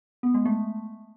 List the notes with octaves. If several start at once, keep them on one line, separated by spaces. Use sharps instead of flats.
B3
G#3
A3